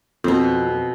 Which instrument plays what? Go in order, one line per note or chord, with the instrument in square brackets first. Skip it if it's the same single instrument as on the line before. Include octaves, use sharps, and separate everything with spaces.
[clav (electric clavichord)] F2 [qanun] B2 C4